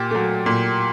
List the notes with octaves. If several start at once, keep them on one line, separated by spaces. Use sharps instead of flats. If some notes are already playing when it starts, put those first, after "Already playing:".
Already playing: A#2 G4
F#3 A3
A#2